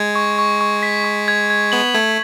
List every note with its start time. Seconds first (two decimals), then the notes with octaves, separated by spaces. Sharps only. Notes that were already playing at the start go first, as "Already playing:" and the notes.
Already playing: G#3 G#6
0.15 C#6
0.39 C#6
0.61 C#6
0.83 B6
1.04 C#6
1.28 G#6
1.50 G#6
1.72 B3 F#7
1.94 A3 G#6